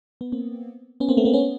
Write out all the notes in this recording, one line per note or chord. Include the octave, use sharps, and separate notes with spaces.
B3
A#3 C4
B3 C#4
A#3 C4
A3 B3
A#3 C4
B3 C#4